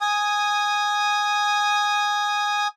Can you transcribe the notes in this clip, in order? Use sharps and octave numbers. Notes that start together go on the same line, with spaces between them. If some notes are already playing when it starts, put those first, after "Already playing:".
G#5 D#6